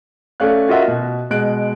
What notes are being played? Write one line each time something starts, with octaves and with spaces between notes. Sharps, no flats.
A3 C#4 D5 F5 F#6
F4 F#4 A#4 D#5 E5 F#5
B2
B2 G#3 F#6 D7